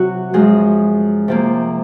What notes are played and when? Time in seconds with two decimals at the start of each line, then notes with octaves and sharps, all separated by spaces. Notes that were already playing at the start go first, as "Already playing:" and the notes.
Already playing: C3 F#3 F#4
0.34 F#2 F3 G#3 G#4
1.28 C3 F3 A#3